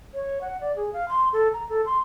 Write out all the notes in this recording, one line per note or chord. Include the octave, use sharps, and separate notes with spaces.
C#5
F#5
D5
G#4
F5
C6
A4
A#5
A4
C6